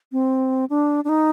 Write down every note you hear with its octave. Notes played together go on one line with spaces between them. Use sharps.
C4
D4
D4
D#4